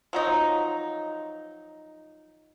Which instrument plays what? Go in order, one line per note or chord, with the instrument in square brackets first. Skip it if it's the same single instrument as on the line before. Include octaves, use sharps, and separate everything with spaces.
[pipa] F3 F#3 D#4